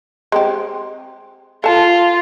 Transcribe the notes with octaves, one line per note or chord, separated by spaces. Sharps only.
G#3 C4 G4
F4 A4 A5